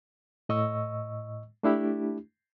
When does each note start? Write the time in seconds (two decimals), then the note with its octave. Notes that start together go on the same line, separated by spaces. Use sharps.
0.49 A2 D#5 C#6 E6
1.63 A3 D4 E4 G4